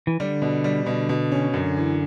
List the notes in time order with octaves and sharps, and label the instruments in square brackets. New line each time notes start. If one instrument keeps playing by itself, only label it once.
[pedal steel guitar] E3
[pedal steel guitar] D3 [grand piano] G3
[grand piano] B2
G3
[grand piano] B2 [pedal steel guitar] D3
[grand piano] B2
C#4
[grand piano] F#2 [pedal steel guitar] D3
[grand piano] E3